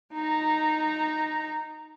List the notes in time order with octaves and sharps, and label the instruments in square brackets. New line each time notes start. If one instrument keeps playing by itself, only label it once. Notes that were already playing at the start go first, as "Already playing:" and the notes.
[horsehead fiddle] D#4 A#5